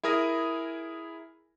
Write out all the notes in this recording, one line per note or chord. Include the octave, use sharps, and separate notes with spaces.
E4 G#4 A#4 D#6 A#6